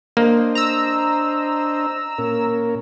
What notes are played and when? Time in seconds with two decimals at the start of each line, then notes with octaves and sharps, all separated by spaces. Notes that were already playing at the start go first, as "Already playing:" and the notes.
0.17 A#3 D4 C5 D#5
0.55 A#5 E6
2.18 A#2 C#4 A#4